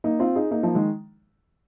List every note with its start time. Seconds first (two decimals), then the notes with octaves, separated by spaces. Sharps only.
0.04 A#3 D#4
0.20 C4 F4
0.35 D#4 G#4
0.51 A#3 D#4
0.63 F3 A#3
0.75 D#3 G#3